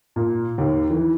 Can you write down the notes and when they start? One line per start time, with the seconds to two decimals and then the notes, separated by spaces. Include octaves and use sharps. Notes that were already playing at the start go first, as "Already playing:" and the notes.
0.16 A#2
0.58 D#2
0.90 E3